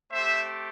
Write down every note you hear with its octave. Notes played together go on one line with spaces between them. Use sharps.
A3 C4 G4 C5 E5